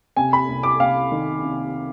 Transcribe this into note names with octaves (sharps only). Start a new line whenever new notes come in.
C3 G#5
B5
C2
D6
C3 F5
D#3
C3